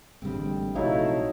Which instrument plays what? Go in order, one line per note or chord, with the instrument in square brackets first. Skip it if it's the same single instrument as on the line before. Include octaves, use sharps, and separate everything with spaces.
[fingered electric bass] A1 D3 [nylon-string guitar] G3 G#3 C4
[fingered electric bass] A#1 C3 [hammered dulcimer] F#3 D#4 F5 [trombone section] A3 E4